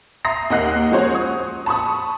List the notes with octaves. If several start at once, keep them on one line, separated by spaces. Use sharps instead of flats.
E5 A#5 C6 D#6 A#6 C7
D#2 A#3 D#5 F#5 F#6 C7
F3 G#3 C#4 F#4 C5 C#5
D#6
A5 B5 C#6 D#6